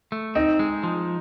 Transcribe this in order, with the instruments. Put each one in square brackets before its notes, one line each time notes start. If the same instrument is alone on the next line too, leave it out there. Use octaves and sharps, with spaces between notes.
[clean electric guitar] A3
[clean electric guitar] C4 [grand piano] D#4
[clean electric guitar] G#3
F3